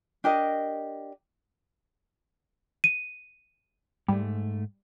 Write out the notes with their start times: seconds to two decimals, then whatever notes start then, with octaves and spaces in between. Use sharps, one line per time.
0.24 D4 G4 A#4 D#5
2.84 D#7
4.08 G#2 G3 A3